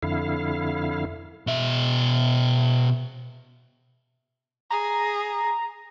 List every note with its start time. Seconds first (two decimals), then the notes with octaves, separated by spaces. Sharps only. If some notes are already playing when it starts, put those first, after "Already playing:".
0.03 F2 D3 E4 F5
1.47 B2 E5
4.70 G#4 A#5